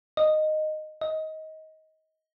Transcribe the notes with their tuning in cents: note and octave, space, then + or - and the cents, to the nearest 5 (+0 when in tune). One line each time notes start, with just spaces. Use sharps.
D#5 -10
D#5 +20